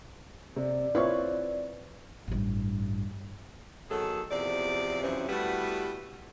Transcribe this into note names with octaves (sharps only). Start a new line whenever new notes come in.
C3 D5
C4 E4 F4 B4 C#5
A1 G2
B2 D#3 F#3 G#4 A4
E2 C3 F3 D5
F#2 C3 E3 F3 C4 C#4
G3 A3 B3 E4 F#4 B4